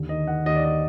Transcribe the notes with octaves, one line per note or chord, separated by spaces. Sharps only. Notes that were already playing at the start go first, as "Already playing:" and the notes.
Already playing: D#2 D3
D#3 D#5
D#3 F#5
D#2 D#5
D5
D#5